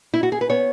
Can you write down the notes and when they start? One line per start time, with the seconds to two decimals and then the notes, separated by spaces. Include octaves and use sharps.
0.14 E4
0.23 F#4
0.32 G#4
0.41 B4
0.50 B3 C#5